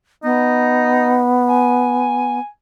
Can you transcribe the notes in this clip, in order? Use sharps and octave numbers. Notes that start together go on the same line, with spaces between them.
B3 D#4
G#5